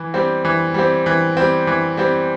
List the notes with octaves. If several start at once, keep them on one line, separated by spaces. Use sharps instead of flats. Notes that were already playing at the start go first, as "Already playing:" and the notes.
Already playing: E3
G3 C4
E3
G3 C4
E3
G3 C4
E3
G3 C4